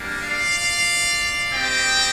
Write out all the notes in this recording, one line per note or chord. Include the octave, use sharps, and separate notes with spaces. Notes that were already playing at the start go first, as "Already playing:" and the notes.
Already playing: G3 A#3 D4
D5 F5
C4 G4 D#5 G5